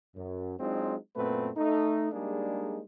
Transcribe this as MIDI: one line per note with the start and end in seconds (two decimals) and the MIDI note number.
0.16 0.55 42
0.60 0.96 54
0.60 0.96 56
0.60 0.96 60
0.60 0.96 62
0.60 0.96 63
0.60 0.96 65
1.16 1.50 42
1.16 1.50 46
1.16 1.50 57
1.16 1.50 59
1.16 1.50 60
1.16 1.50 71
1.57 2.12 57
1.57 2.12 63
2.13 2.81 55
2.13 2.81 56
2.13 2.81 58
2.13 2.81 62
2.13 2.81 63
2.13 2.81 68